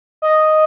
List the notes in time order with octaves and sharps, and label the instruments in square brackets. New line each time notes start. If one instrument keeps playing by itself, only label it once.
[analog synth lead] D#5